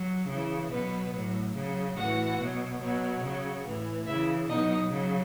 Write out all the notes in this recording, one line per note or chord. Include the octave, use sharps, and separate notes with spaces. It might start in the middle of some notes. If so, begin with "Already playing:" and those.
Already playing: F#3
C#3 E3
B2 F#3 B3 B4
A2 F#3
C#3 F#3
A2 E3 F#4 F#5
B2 F#3
B2 F#3
C#3 F#3
A2 E3
C#3 E3 E4 E5
B2 F#3 D#4 D#5
C#3 F#3